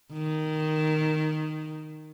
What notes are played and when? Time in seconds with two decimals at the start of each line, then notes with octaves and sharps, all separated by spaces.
0.13 D#3